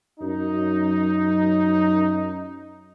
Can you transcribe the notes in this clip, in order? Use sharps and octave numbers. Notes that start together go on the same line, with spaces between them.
F#2 D#4